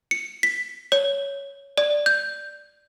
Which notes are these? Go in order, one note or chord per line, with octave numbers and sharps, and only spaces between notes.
C#7
B6
C#5
D5
G6